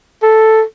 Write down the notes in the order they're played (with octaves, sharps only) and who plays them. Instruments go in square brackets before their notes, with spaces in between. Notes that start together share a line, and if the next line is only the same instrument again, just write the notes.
[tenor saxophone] A4